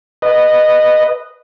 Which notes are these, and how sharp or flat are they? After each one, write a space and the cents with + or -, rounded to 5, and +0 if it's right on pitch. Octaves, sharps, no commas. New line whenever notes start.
B4 +0 D#5 -15